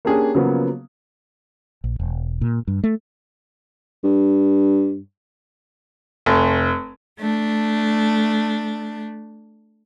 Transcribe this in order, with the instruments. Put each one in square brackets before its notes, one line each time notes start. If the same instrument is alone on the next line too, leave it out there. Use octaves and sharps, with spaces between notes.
[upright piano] A#3 C#4 D4 G4 G#4
C#3 F3 F#3 A#3 B3
[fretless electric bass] A#1
E1
A#2
G2
A3
[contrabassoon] G2
[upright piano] F1
[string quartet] A3 D4